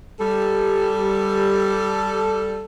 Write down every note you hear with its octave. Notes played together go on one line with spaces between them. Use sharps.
G3 A4